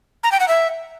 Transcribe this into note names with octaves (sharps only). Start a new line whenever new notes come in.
A#5
G5
F#5
E5